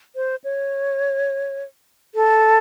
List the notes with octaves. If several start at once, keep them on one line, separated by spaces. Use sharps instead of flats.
C5
C#5
A4